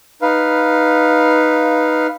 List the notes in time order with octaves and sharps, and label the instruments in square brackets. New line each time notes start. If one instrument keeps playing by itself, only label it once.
[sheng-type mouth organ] D#4 B4 F5